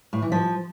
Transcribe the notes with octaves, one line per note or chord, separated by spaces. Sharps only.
A2
E3
F3